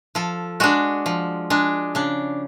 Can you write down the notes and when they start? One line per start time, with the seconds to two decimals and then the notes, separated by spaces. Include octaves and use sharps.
0.15 F3 A4
0.60 G#3 D4 F#4
1.06 F3
1.50 G#3 D4
1.95 C#3 D4